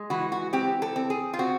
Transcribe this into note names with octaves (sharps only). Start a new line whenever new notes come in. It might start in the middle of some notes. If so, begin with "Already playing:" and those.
Already playing: G#3
E3 F#4
F#4
C4 G4
A4
C4
G#4
F4
C4 F#4